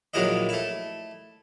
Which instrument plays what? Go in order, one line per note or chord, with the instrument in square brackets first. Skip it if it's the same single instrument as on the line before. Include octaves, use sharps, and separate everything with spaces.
[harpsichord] A#1 D#3 F#3 G#3 E4 D#5
A3 E4